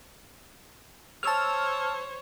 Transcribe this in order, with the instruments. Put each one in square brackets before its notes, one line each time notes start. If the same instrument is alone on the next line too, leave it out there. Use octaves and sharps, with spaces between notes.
[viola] C5 C#5 [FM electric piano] A5 E6 F6